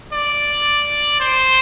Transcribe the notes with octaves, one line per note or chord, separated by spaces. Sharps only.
D5
C5